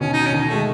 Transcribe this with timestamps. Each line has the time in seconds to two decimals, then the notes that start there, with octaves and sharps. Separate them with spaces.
0.01 B2 D#3 C#4
0.13 D#4
0.26 C#4
0.32 B2 D#3
0.48 G#3 A3